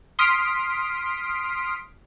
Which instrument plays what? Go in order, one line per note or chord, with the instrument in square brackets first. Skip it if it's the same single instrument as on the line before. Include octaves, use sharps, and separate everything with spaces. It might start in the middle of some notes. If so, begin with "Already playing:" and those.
[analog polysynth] C6 D#6 F6 B6 C7 D7